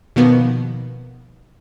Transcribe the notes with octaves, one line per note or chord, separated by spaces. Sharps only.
B2 D#3 F3 A#3 B3